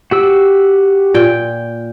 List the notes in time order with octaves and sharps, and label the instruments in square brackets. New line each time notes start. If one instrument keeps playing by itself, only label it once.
[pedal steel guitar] F#4 G4 E6
[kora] A#2 G5